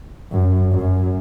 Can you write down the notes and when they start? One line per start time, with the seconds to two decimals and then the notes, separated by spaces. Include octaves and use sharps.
0.32 F#2
0.72 F#2